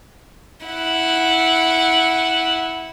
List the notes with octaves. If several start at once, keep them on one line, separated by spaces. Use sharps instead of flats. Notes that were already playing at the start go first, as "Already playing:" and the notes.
E4 F#5